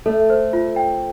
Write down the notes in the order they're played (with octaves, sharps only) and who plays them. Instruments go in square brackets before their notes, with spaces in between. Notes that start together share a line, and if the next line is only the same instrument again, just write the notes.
[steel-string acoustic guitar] A3 [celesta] A4
[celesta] C5
F4
G5